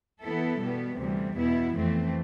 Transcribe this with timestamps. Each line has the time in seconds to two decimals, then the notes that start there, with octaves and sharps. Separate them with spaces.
0.22 E3 B3 E4 A4
0.60 B2 G3 B3
0.99 D2 C3 E3 G3
1.37 E2 B2 B3 E4
1.75 F2 E3 A3 C4